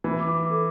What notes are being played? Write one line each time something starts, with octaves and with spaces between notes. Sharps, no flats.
E3 B5
D6
D6
A4